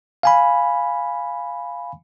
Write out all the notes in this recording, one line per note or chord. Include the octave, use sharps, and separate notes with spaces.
F5 G#5 B5